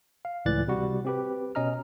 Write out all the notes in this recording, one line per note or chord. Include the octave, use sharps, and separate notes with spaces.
F5
C#2 A2 E3 D5 F#6 A6
C3 G3 F#4
C4 G4 B4
B2 C#4 D#5 A#5 F6